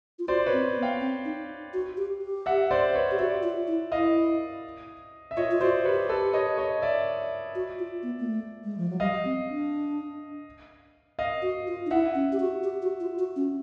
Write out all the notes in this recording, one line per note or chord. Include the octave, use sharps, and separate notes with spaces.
F4
F#4 C5 D5
B4 C#5
C4
B3
F5 G5
C4
D#4
F#4
G4
G4
E5 F#5
C5 D5
B4 C#5
G4
F#4 D5 E5
F4
E4
E4 D#5 F5
E5
F4 C#5 D#5
F4
F#4 C5 D5
G4 B4 C#5
A4 B4
C#5 D#5
C#5 D#5
D5 E5
F#4
F4
B3
A#3
A3
G#3
F3
F#3
G3 D#5 F5
C4
D4
D#5 F5
F#4
F4
D#4
E4 E5 F#5
C#4
G4
F#4
G4
F#4
F4
F#4
C#4